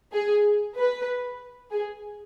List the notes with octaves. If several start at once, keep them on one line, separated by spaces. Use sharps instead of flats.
G#4
B4
G#4